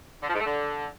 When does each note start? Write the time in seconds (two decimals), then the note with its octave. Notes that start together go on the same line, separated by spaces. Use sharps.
0.22 D3
0.28 F3
0.34 G#2
0.40 A3
0.46 D3